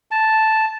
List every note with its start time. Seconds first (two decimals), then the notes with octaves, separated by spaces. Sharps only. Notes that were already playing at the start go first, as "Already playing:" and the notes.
0.11 A5